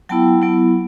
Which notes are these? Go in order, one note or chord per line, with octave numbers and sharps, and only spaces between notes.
F#3 B3 E4 G5 A5
F#3 B3 E4